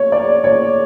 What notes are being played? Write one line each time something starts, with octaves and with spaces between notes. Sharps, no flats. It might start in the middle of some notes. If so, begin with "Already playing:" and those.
Already playing: C#5
D5
C#5